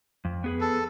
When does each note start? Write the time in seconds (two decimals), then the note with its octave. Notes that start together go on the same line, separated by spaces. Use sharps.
0.25 F2
0.44 B3 G#4 B4
0.61 A4